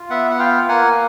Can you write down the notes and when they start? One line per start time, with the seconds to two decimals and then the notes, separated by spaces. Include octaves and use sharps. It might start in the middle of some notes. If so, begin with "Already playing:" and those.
Already playing: F4
0.10 B3 E5 F#5
0.31 F#5
0.39 F4 F5 G5
0.69 A#3 F#5 G#5